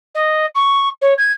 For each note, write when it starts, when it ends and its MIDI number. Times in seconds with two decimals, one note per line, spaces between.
0.14 0.46 75
0.55 0.88 85
1.01 1.13 73
1.17 1.32 92